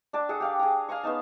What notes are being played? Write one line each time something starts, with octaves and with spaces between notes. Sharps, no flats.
D4 D5 A5
G#4 A4 D5 F#5
G4 F5 G5
G#4 A#5
F5 G#5 A#5 C#6
B3 C#4 D#4 A5